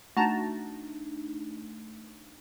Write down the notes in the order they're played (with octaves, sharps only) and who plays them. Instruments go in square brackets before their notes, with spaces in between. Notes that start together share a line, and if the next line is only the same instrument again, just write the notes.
[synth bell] A3 D4 D#4 [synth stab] F#4 A5 A#5